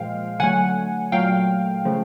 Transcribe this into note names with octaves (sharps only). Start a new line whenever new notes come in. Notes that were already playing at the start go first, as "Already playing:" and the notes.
Already playing: A#2 F3 G#3 F5 G5
D3 F#3 A3 F#5 G#5
A#2 F#3 A3 F5 G5
C#3 F3 A3